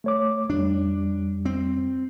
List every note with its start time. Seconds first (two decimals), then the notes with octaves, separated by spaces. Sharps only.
0.04 A3 C#5 D6
0.50 F2 G3 D4
1.45 C4